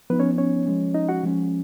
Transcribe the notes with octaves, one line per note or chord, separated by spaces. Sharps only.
F3 B3 D#4 B4
C#4 C#5
C#4 C#5
F3 G#3 C#4
D#4 D#5
F#4 F#5
F3 G#3 C#4